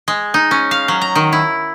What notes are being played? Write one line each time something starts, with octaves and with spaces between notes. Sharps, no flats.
G#3
D#4
C#4
F5
F#3
A#5
D#3
E4